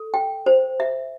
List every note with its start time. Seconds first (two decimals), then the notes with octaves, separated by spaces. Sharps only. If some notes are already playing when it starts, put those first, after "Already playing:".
Already playing: A4
0.14 G5
0.46 C5
0.80 E5